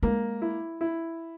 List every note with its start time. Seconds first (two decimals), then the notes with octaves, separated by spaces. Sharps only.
0.03 G#3 A#3
0.42 E4
0.81 E4